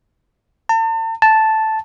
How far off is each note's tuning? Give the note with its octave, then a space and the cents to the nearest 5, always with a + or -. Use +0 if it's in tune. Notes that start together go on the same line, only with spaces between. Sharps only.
A5 +40
A5 -5